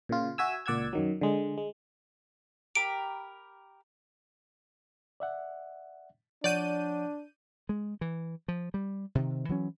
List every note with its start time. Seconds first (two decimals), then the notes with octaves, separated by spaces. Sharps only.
0.09 A#2 C#3 F4
0.38 F#4 E5 G#5 E6
0.66 C#2 A#2 D5 F#5 E6 G#6
0.93 F#2 D#3 F#3
1.21 D3 G#3
1.58 G#3
2.76 G4 A#4 B5 D7
5.20 D5 E5 F#5
6.44 F3 D4 C#5 D5 F#5 G6 D#7
7.69 G#3
8.01 E3
8.48 F3
8.74 G3
9.15 C3 D#3
9.49 E3 F#3 C#4